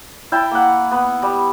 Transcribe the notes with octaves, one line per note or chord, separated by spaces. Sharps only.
E4 G5 A5
A#3 F#5
B3
G3